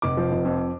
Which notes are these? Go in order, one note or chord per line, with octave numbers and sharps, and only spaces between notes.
F1 D6
F3
F1
F2